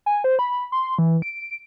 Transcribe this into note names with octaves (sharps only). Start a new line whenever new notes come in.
G#5
C5
B5
C6
E3
D7